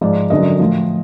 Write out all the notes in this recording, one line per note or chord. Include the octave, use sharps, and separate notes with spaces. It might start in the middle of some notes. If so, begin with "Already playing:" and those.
G#2 F3 D5
F#2 D3 F#3 D#5
A2 F3